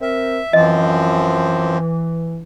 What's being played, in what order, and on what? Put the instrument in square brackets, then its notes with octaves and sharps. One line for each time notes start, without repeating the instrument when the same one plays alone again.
[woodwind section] C4 A#4 [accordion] E5
[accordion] F#2 F3 C4 [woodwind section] E3 [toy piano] D#5